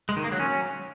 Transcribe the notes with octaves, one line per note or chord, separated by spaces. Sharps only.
G#3
D#3
A#3
F#3
C#4